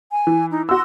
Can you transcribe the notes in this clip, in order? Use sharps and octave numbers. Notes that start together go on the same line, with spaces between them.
G#5
E3
D#4
F#4 C6 E6